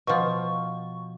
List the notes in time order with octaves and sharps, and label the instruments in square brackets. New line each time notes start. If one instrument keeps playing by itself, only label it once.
[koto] B2 F3 [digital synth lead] C#6